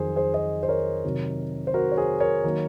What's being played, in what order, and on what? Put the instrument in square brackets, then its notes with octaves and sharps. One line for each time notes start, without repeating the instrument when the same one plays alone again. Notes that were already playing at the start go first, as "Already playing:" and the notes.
Already playing: [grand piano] F2 D#3 F#3 G#4 C5
G#4 C5
C5 D#5
C5
A#4 C#5
C3 D#3 F#3
C5
F#4 A#4
C#5
G#4 C5
A#4 C#5
D#3 F#3 A#3